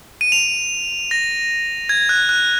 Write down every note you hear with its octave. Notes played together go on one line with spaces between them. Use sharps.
D#7
F7
A#6
G#6
F#6
F#6